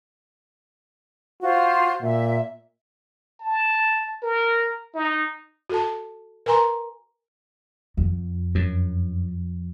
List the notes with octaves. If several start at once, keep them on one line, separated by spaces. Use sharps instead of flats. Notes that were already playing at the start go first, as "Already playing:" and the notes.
F4 F#4 C5
A#2 E5
A5
A#4
D#4
F#4 A4 A5
A#4 B4 G#5 A#5 C6
F2
F#2